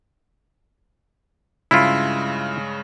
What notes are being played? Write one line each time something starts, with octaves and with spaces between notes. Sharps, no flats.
G2 C#3 G#3 E4 F4